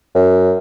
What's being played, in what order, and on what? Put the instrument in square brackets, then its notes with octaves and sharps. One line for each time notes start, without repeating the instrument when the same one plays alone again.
[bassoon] F#2